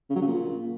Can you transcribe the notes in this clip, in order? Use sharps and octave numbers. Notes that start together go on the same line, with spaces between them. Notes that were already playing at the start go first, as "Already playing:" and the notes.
C#3
F#3
C#3
A#2